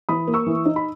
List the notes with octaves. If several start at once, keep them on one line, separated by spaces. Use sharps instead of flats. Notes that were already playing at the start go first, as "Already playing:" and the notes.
E3 B5 D#6
A#3
C#6 E6
E3
D#4
B5